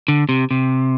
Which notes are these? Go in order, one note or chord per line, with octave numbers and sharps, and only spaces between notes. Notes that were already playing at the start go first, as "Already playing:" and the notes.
D3
C3
C3